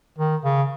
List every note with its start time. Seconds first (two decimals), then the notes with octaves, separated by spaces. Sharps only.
0.18 D#3
0.45 C#3